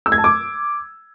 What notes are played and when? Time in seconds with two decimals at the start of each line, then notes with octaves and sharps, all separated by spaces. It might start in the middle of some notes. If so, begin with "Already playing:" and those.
0.06 E6
0.12 G#6
0.18 A5
0.24 D6